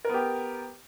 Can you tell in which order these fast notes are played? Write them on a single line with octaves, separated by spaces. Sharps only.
A#4 B3 G4